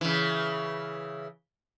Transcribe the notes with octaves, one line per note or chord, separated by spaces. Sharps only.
C#3 E3